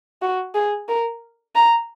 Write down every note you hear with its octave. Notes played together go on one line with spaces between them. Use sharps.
F#4
G#4
A#4
A#5